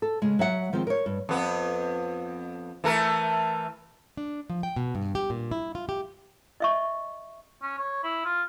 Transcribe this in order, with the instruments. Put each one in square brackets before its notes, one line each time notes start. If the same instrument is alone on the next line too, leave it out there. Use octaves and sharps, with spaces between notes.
[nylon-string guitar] A4
C#3 G#3
F#3 E5 F#5
D#3 F3 G#3 C4
A#4 C#5
G2
[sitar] F2 B3
E3 A3 A#4
[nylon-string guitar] D4
F3
G5
B2
G2
G4
A#2
E4
F4
G4
[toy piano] D#5 E5 C#6
[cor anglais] C#4
C#5
E4
F4